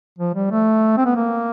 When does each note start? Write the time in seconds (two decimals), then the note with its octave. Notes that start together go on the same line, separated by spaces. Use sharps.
0.19 F3
0.34 G3
0.51 A3
0.97 C4
1.06 B3
1.16 A#3